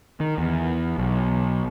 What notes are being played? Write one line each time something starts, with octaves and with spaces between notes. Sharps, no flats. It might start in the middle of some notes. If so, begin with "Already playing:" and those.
D#3
E2
B1